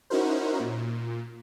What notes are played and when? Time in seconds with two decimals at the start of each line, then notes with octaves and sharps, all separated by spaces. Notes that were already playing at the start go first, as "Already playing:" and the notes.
0.10 C#4 D#4 E4 F#4 A#4 C5
0.60 A#2